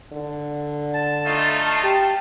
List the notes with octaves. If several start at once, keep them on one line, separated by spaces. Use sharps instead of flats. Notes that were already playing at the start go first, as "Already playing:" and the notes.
D3
A5
A3 D#4 F4
G4